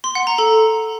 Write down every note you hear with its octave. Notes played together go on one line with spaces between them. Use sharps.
C6
F#5
A#5
A4